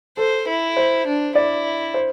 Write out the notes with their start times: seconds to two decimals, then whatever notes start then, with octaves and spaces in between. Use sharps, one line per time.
0.17 A4 C5
0.48 E4
0.77 C5
1.07 D4
1.35 E4 D5
1.94 C5